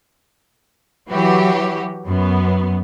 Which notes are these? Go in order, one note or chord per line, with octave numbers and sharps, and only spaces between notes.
E3 F#3 F#4 G4
F#2 B3